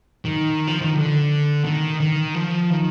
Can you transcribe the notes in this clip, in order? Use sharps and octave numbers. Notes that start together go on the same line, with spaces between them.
D#3
F3
D#3
D3
D#3
D#3
F3
D#3